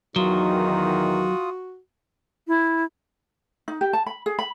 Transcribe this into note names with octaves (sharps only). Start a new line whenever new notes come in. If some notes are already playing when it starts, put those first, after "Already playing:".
E2 D#3 F#3 F4 F#4 D#6
E4
D#4
G4
A5
B5
G#4
B5